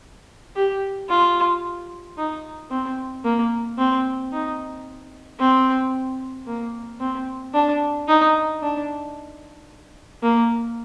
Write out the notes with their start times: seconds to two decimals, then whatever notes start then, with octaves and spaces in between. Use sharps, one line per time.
0.56 G4
1.09 F4
2.18 D#4
2.71 C4
3.24 A#3
3.78 C4
4.33 D#4
5.40 C4
6.47 A#3
7.00 C4
7.54 D4
8.08 D#4
8.62 D4
10.23 A#3